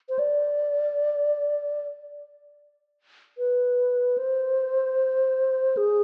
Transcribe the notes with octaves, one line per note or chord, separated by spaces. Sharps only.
C5
D5
B4
C5
G#4